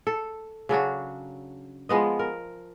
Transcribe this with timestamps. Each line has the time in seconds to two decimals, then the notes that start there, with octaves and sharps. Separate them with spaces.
0.07 A4
0.69 C#3 F#3 D4 F#4
1.89 F3 G#3 B3 D#5
2.19 A#4